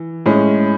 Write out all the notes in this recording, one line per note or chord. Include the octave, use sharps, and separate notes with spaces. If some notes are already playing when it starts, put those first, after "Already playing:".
Already playing: E3
A2 G#3 C#4